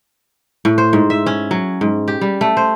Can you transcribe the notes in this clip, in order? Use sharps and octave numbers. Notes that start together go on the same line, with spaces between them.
A2
C5
G#2
E5
C#4
F#3
G#2
G4
G3
A3
C5